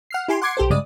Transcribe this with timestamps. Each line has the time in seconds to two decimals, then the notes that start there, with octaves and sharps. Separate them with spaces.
0.11 F#5 F6 C7
0.28 E4 G4 G#5 C6
0.42 F#5 C6 D6 G#6 C7 C#7
0.57 B1 G4 A4 C5
0.70 G2 C#3 G#3 D5 D#6